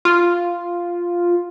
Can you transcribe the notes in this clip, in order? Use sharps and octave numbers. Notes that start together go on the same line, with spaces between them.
F4